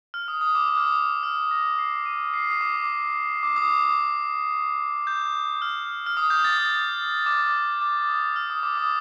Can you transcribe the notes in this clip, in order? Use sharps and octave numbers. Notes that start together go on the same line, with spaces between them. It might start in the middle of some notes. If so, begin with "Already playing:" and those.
F6
D#6
D#6
D6
D#6
F6
D#6
F6
A#6
C7
D#7
C7
D#6
D6
D6
D#6
D6
D#6
G6
F6
F6
D#6
G6
A6
D#6
D6
D6
D#6
F6
D#6
D6
D#6